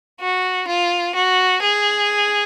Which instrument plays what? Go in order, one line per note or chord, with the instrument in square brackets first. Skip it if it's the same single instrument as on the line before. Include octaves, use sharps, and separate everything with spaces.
[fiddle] F#4
F4
F#4
G#4